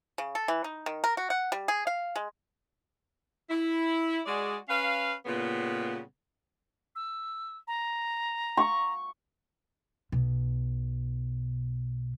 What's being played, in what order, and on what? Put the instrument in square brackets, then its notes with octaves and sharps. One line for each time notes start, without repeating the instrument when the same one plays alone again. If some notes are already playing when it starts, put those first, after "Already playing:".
[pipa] C#3
A4
E3
D#4
D#3
A#4
F#4
F#5
G3
G#4
F5
G#3
[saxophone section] E4
G#3 F#4 G#4 D5
C#4 B4 F5
A#2 C#3 G3 B3
[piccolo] E6
A#5
[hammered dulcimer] C#6
[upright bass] B1 B2